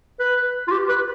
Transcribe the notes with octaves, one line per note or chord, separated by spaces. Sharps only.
B4
F4
G4
B4